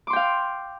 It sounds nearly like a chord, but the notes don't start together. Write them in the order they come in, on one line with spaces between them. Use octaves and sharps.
D6 C6 G5 F5